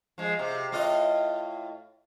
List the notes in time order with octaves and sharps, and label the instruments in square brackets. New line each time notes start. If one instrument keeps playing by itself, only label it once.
[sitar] F3 G#3
C3
A2 F4 D#5